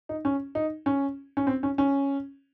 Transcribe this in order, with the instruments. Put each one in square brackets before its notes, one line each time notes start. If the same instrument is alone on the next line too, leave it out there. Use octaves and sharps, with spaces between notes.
[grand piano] D#4
C#4
D#4
C#4
C#4
C4
C#4
C#4